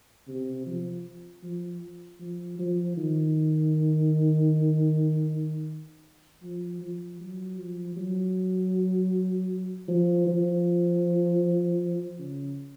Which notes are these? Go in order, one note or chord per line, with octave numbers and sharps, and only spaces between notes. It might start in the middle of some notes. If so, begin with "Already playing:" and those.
C3
F3
F3
F3
F3
D#3
F3
F3
F#3
F3
F#3
F3
F3
C#3